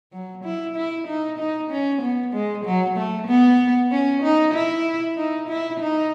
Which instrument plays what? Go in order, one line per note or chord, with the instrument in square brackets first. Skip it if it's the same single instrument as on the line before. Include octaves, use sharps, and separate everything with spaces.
[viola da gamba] F#3
E4
E4
D#4
D#4
C#4
B3
G#3
F#3
A3
B3
C#4
D#4
E4
D#4
E4
D#4